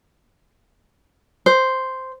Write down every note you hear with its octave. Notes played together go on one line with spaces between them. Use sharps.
C5